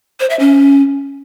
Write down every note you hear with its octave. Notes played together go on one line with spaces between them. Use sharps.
C5
E5
C#4